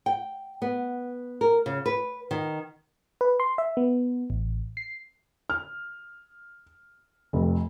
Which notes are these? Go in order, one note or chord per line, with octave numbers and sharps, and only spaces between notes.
G5
B3
A#4
C#3
B4
D#3
B4
C6
E5
B3
A1
C7
F6
F1 F2